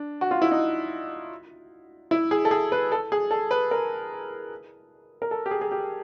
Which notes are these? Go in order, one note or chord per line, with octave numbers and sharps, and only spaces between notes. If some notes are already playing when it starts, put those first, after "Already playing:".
Already playing: D4
F#4
F4
E4
D#4
E4
G#4
A4
G#4
B4
A4
G#4
A4
B4
A#4
A#4
A4
G4
G#4
G#4
G4